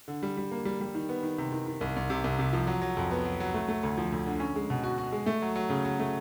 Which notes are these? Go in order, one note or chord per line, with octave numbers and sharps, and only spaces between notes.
D3
G3
G3
A#3
G3
G3
D#3
B3
D#3
C3
D#3
D#3
C2
C2
C3
C2
C3
F3
F#3
F#3
F2
B3
F#3
F#3
A3
A3
D2
F3
D2
D3
C#4
G#3
B2
F#4
F#4
G#3
A3
F#3
F#3
C#3
F#3
A3